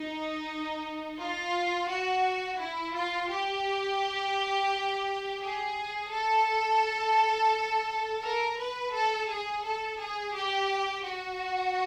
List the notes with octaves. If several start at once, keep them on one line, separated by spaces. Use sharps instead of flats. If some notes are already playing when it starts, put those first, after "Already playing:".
Already playing: D#4
F4
F#4
E4
F4
G4
G#4
A4
A#4
B4
A4
G#4
A4
G#4
G4
F#4